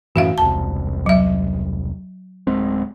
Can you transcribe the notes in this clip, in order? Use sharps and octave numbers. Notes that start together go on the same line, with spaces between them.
F#2 A2 E3 F#4 E5 F5
E1 C2 A5
F#3 E5
D1 G#3 C4